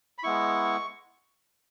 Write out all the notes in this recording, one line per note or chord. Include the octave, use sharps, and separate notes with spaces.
B5
G#3 B3 E4 C#6